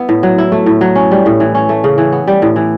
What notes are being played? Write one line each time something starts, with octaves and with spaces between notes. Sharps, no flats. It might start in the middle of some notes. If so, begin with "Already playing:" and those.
Already playing: B3 E4
A2
F#3
E4
A3
A2
F#3
C#4
G3
A2
E3
C#4
A3
C#3
E3
B3
G3
A2
E3